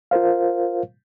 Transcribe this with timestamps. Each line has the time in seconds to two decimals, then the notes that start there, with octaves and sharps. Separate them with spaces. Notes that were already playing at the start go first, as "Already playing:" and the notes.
0.11 F4 A#4 C5 F5